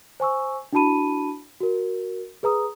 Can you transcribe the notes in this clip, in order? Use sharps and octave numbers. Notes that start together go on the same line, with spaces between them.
C5 G#5 C#6 E6
D4 E4 F#4 A5 B5 D#7
F#4 A#4
G#4 B4 A#5 D#6